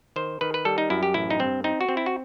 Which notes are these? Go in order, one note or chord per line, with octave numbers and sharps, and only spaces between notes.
D#3 C5
D#3 B4
B4
G3 A4
D#4
F#2 E4
G4
A1 E4
D#4
G2 C4
C4 D#4
F#4
C4
E4
F#4